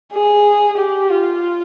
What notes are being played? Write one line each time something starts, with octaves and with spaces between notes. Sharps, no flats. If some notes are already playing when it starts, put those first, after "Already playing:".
G#4
G4
F4